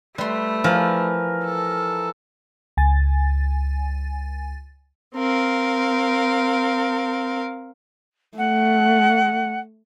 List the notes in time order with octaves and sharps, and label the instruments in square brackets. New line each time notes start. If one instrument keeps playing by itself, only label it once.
[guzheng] G3 C6 [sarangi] A3 [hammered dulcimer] B4
[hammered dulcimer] E3 A#4 [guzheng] F3
[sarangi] A4
[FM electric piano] C#2 G#5 A6
[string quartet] C4 A#4 F5
[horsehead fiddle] A3 [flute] F#5